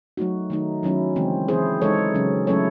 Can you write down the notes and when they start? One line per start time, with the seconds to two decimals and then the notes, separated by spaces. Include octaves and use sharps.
0.17 F#3 A3 D#4 F#4
0.50 D#3 A3 D#4
0.83 D#3 F#3 C#4 E4
1.16 C#3 E3 G#3 C4
1.48 E3 C4 E4 G#4 C5
1.82 E3 G#3 D#4 A4 C#5
2.14 C#3 F#3 C#4
2.47 F#3 A3 C#4 E4 A4 C#5